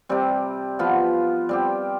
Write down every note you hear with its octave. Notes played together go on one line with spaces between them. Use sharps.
C3 G3 C4
F3 B3 F4
G3 C4 G4